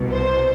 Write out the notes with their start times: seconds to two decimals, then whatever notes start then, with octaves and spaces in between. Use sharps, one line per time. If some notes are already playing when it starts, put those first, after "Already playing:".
Already playing: C2 B2
0.11 C5